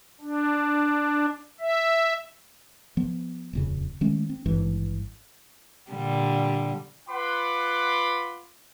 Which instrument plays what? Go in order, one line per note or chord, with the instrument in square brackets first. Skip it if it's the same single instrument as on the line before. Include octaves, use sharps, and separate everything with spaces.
[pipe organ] D4
E5
[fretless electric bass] F3 B3
D#1 F2 C#3
D#3 G#3 A3 C#4
C4
G#1 G2 E3
[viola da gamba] A#2 D3 G3
[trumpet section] F4 B4 F#5 B5 C6 D6